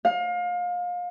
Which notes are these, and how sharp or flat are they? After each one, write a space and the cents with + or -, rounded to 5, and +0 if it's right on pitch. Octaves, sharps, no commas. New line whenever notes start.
F5 +30